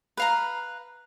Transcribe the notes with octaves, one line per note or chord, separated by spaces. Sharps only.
B4 F5 A#5